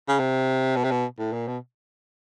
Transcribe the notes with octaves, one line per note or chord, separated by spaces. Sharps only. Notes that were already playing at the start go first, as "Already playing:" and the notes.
C#3
C3
B2
C3
B2
A2
A#2
B2